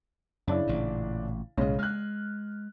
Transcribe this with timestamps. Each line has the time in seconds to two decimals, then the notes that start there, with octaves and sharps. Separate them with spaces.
0.47 F#2 C#3 D4 E4
0.67 A1 A#2
1.57 B1 A2 C#3 G#3 C#4
1.79 G#3 F6 F#6